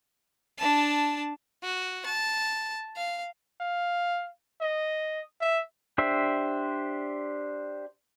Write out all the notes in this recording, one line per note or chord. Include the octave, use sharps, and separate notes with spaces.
D4 A5
F#4
A5
F5
F5
D#5
E5
D4 G4 C5 E5